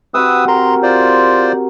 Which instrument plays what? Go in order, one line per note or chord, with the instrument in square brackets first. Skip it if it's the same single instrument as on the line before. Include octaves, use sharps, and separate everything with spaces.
[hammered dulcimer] C3 F#4 [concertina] B4 D#6 E6
[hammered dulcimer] A#4 [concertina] A#5 C6
[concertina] F4 C5 D5